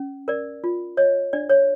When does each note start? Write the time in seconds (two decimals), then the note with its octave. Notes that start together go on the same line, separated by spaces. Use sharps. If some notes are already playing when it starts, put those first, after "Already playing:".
Already playing: C#4
0.28 A#4 D5
0.64 F4
0.97 C#5 D#5
1.33 D4 D5
1.50 C#5